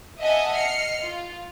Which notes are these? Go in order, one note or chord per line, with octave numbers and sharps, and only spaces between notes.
D#5 E5 F#5 G#5 A5 D#6
D#5 F6 C7 C#7
F4